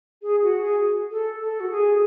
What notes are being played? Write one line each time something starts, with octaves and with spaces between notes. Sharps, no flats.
G#4
F#4
G#4
A4
A4
F#4
G#4